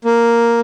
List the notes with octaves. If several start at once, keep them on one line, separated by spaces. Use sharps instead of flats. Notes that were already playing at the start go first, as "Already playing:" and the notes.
A#3